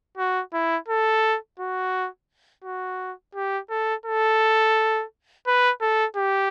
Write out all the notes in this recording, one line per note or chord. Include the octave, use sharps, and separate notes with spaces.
F#4
E4
A4
F#4
F#4
G4
A4
A4
B4
A4
G4